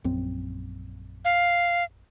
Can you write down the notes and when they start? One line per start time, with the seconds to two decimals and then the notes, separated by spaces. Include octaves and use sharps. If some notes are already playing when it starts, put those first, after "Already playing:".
0.04 A#1 F#2 C4
1.25 F5